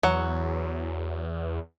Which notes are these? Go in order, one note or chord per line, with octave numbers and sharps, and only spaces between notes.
E2 F#3 F#5